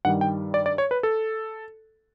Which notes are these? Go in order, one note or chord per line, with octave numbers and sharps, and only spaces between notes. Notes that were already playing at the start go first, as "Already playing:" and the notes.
G2 D#3 G3 F#5
G5
D5
D5
C#5
B4
A4